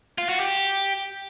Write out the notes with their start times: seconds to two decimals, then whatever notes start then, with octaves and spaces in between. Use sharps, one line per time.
0.18 F4
0.29 F#4
0.40 G4